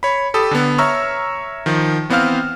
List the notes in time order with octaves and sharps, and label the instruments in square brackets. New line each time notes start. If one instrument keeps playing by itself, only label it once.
[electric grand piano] C#5 B5
G4 A4 B5 D#6
D3 B3
C#5 E5 A#5 C#6 E6 F6
D#3 F3
E3 B3 C4 C5 F5 F6